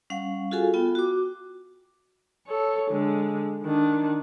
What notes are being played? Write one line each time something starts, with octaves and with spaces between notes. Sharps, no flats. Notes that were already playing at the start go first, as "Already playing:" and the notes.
G3 C#4 F5 F#5
F4 F#4 G#4 A4 F5 G#5
B3 F4 G5
F#4 D6
A4 C#5
D3 G#3
D#3 D4